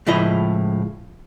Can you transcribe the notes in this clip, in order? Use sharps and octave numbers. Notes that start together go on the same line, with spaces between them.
C#2 A2 F3 E4 D#5